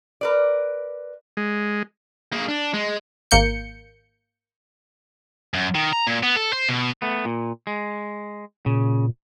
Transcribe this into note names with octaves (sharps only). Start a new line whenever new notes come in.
A#4 B4 D5
G#3
A#3 G#4
D4
G#3
G#1 A#3 G6 C#7
F#2
D#3
A#5
A#2
B3
A4
C5
B2
A3 B3
A#2
G#3
A#2 C#3